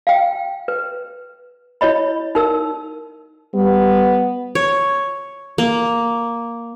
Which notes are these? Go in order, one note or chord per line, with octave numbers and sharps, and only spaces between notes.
F5 G5
B4
E4 C#5 D#5 B5
D#4 A#4 E6
G3 B3
C#5
A#3